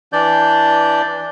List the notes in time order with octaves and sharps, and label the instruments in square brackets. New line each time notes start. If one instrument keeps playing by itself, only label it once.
[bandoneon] E3 D4 D5 G6